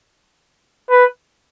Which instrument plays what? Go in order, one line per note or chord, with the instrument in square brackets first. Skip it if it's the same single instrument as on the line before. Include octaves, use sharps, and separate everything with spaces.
[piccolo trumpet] B4